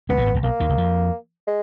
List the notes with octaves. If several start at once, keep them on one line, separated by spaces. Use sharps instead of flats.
C#2 C#3 B3
A#1 A#2
G#1 G#2
A#1 A#2
B1 B2 A#3
D#2 D#3
C#2 C#3
F2 F3
G#3